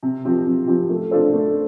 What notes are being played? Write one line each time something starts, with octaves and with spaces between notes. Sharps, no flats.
C3
F3 C4 G4
C3
F3 C4 G4
A3
D4 F4 A4 C5
A3